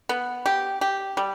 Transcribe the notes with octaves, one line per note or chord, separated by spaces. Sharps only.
B3
G4
G4
G3